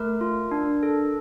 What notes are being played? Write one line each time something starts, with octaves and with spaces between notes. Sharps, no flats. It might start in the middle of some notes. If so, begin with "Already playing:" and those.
Already playing: A3 A#4
F4
D4
A4